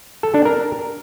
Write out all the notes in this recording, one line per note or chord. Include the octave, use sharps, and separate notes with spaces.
A4
D4
A#4